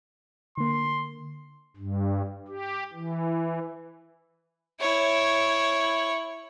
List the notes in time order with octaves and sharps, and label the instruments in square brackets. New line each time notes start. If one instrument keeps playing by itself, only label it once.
[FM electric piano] D3 A#3 [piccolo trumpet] C6
[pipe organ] G2
G4
E3
[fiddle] E4 C#5